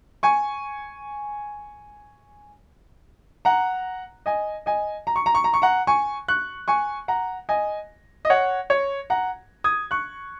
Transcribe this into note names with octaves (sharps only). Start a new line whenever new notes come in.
G#5 C#6
F#5 A#5
D#5 G#5
D#5 G#5
A#5
C#6
A#5
C#6
A#5
C#6
F#5 A#5
G#5 C#6
C#6 F#6
G#5 C#6
F#5 A#5
D#5 G#5
D#5
C#5 F#5
C#5
F#5 A#5
D#6 G#6
C#6 F#6